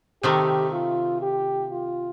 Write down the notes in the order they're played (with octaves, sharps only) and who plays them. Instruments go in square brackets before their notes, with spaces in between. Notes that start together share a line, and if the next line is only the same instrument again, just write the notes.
[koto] C3 D#3 A3 [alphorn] G4
[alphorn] F4
G4
F4